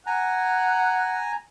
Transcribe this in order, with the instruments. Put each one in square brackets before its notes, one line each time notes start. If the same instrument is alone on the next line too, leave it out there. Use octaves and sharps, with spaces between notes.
[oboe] F#5 [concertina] G#5 A#5